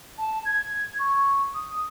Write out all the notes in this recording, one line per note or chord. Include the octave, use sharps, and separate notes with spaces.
A5
G#6
C#6
D#6